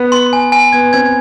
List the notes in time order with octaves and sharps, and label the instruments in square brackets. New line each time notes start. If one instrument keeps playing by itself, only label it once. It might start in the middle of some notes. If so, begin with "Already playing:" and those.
Already playing: [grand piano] B3
[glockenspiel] C6
G#5
G#5
[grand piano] B3 [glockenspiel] G#6
[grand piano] C4 [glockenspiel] G#6